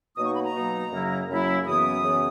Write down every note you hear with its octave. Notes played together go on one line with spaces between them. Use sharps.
B2 F#3 A#3 D#4 D#6
C#6
B5
A#5
B2 F#3 A#3 D#4
F#2 C#3 F#3 A#3 E4
F#2 C#3 F#3 A#3 E4
F#2 C#3 E3 B3 D#6
F#2 C#3 E3 B3